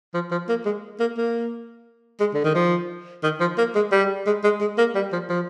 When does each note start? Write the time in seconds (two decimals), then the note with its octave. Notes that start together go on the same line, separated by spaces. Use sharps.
0.14 F3
0.31 F3
0.49 A#3
0.65 G#3
1.00 A#3
1.17 A#3
2.20 G#3
2.34 D3
2.44 D#3
2.55 F3
3.24 D#3
3.40 F3
3.58 A#3
3.75 G#3
3.92 G3
4.27 G#3
4.44 G#3
4.61 G#3
4.78 A#3
4.95 G3
5.13 F3
5.30 F3